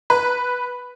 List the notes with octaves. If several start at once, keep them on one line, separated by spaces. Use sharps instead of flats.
B4